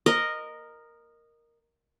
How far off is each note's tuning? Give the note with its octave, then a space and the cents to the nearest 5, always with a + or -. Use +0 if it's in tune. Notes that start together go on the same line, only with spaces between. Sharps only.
A#4 +0 D#5 -15